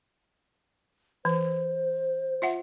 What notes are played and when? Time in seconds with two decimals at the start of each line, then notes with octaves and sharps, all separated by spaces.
1.25 E3 C5
2.42 F4 E5 F#5